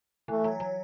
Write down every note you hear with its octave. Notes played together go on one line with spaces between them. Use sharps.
E3 A3
F#3
F#3